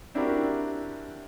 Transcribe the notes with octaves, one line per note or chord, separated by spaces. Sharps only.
C4 D4 E4 F#4 G4 A#4